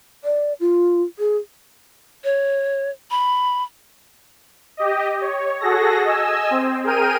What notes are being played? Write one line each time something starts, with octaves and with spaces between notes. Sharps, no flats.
D5
F4
G#4
C#5
B5
G4 D#5
C#5
F#4 G#4 A4 A#6
D#5 G#5 E6
C4
G#4 A#4 G5 F6 D#7